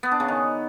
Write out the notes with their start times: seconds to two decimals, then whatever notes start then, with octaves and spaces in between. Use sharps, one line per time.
0.03 B3
0.11 D4
0.20 C#3
0.28 D#3